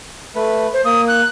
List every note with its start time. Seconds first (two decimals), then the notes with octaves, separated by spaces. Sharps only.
0.35 A3 B4
0.74 C5
0.85 A#3 D#6
1.08 F#6